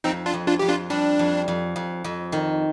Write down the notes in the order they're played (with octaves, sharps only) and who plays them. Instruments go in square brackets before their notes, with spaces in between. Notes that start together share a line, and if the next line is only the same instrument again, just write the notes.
[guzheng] F2 [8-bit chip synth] C4 D#4
[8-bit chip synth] D4 F4
[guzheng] F2
[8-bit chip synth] D4 F4
[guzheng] F2 [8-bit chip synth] G4
[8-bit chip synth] D4 F4
[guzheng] G3 [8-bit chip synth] D4
[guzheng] F2
F2
F2
F2
D#3